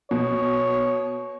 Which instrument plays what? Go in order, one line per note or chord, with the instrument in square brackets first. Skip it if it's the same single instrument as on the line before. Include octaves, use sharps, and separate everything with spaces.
[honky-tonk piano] B2 [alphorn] C#5